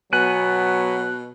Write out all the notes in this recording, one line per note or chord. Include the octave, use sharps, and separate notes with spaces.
B2 F#3 B3 G#5 F#6